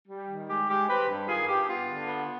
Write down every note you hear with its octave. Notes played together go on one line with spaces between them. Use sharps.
G3
D#3
G#3 G4
G#3 G4
C4 G4 B4
G2
D#3 F4 G#4
G2 G4
B3 F4
D3
B3